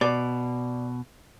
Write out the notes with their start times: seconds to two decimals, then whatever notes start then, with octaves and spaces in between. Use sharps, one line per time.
0.01 B2 D5